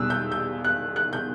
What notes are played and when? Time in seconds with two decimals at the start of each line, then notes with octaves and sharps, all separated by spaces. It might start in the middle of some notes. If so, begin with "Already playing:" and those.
Already playing: E2 B2 G3 E6 F#6
0.10 G6
0.32 G6
0.65 F#6
0.96 F#6
1.13 G6